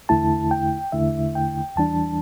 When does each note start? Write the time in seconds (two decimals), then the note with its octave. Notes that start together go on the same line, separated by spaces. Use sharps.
0.09 E2 D3 A3 E4 A5
0.51 G5
0.92 E2 D3 A3 E4 E5
1.35 G5
1.76 E2 E3 G3 D4 A5